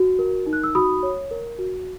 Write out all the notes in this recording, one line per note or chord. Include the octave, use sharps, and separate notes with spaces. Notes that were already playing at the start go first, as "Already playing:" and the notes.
Already playing: F#4
A#4
D#4
F#6
E6
F#4 B5 D#6
C#5
A#4
F#4